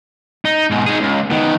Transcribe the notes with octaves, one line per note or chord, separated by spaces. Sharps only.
D#4
G#2 B2
D#3 G#4
C#2
D#3 B3